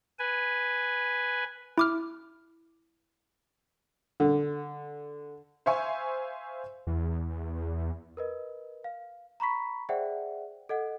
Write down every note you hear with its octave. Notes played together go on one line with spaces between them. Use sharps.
B4 G#5
E4 D6 F6
D3
C5 E5 F5 G#5 C#6
E2
A#4 B4 D#5
F5
A#5 B5 C#6 B6
G#4 C5 D5 E5 F#5 G5
A4 D#5 F#5